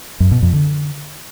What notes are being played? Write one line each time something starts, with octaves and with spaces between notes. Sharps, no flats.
F#2
B2
F2
D3